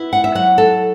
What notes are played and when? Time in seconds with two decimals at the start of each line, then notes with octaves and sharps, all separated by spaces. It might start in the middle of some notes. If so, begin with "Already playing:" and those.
Already playing: B3 E4
0.13 F#5
0.24 E5
0.35 F#3 F#5
0.58 A4